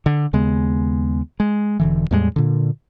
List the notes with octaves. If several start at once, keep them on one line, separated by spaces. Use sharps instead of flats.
D3
D#2 C#3 G#3 B3
G#3
E1 D3 E3
E2 A2 G3 G#3
A#2 D3